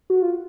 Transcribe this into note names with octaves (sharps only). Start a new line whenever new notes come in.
F#4
F4